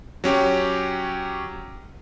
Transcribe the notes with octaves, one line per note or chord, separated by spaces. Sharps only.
F#3 C#4 G4